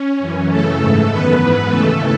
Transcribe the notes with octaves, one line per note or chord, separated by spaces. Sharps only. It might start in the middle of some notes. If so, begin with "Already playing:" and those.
Already playing: C#4
F#2 E3
F#2 C#3 E3 A3 A4
G#2 E3
F#2 D#3 B3 B4
G#2 E3
D#2 C#3 E3 A3 A4